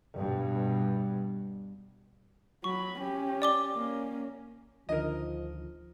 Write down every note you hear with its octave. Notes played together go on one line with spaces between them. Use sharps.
G2 B2
F#3 B5 C#6
C#4 G4
D5 D6 G7
A#3 C#4
D2 D3 D#3 F3 A#4 D#5